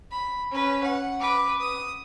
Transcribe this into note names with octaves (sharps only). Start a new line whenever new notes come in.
B5
C#4 B4
F#5
B4 D6
D#6